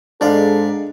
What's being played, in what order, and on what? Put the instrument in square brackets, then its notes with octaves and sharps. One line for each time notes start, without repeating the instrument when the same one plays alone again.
[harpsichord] G#2 D5 F5 [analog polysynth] G#3 [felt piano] D4 [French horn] A4